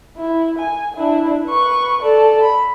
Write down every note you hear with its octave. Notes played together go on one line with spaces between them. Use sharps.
E4
G#5
D4 E4
B4 C#6
A4 D5
B5